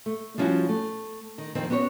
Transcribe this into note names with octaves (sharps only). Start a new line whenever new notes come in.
A3
F3 G3 C#4 D#4 E4 F#4
A3
D#3
F2 D#3 C4
B3 C#4 F#4 C5 C#5